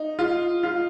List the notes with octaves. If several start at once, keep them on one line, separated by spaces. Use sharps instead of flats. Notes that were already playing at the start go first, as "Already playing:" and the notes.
Already playing: D#4
F4
F4